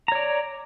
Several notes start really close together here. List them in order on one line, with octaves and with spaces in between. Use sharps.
A#5 C#5 D5